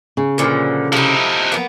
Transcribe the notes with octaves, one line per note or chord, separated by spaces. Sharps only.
C#3
A#2 D3 F3
C3 F3 D#4 E4
A#3 B3